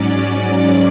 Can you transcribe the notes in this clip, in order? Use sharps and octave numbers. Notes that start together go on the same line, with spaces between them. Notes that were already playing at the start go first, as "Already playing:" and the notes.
Already playing: G#2 F#3 C#4 D5
D5